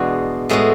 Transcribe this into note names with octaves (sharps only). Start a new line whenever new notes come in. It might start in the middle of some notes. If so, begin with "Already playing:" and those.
Already playing: E2 B2 G#3 D4 F#4
A2 G#3 B3 F#4